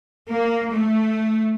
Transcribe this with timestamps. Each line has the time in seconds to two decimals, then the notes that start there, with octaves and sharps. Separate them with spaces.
0.31 A#3
0.74 A3